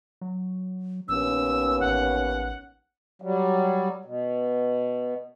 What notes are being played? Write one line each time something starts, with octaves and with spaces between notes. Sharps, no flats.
F#3
A#1 D#2 B3 C#4 E6
A1 F#5
F#3 G3
B2